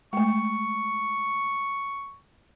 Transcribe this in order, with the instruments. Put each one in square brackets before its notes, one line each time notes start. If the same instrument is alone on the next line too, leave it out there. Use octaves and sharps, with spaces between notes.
[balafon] G#3 A3 [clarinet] C#6